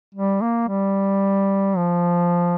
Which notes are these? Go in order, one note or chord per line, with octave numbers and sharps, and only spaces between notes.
G3
A#3
G3
F3